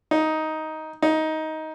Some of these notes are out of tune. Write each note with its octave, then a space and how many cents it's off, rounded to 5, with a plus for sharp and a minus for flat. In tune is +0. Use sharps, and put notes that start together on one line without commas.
D#4 +10
D#4 +15